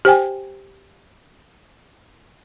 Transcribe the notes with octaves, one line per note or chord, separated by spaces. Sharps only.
G4 C5 G5 G#5